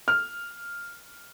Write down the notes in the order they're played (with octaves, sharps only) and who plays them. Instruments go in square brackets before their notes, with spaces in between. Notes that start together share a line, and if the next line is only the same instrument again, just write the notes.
[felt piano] F6